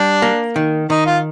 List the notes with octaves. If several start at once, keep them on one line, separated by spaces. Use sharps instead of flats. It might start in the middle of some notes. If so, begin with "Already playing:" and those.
Already playing: G3 D4
A#3
D#3
D#3 D#4
F4